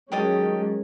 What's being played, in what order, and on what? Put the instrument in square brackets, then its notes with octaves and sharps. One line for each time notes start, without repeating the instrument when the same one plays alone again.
[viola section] D#3 G#3 C#4 [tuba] F#3 [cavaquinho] G4 D#5 A5